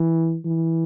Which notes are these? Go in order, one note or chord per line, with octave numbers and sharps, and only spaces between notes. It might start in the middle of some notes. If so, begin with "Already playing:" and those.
Already playing: E3
E3